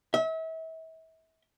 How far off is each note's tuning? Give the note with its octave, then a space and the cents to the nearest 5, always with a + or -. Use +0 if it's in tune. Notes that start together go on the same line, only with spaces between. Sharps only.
E5 -35